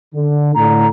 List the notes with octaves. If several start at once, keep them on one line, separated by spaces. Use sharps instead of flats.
D3
A2 D3 A#5